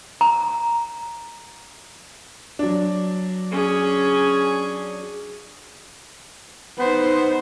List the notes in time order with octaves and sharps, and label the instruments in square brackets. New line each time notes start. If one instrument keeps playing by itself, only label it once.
[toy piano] A#5
[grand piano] F#3 D4
[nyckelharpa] C#4 G#4
[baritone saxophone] B3 [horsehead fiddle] D#4 C5